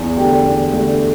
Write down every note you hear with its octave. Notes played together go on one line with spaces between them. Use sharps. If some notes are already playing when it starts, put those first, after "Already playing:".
Already playing: E2
D3 A3 D4 G4
E2
D3 A3 D4 G4